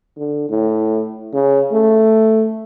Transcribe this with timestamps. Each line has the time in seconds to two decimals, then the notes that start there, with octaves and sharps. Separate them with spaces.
0.17 D3
0.49 A2
1.33 C#3
1.72 A3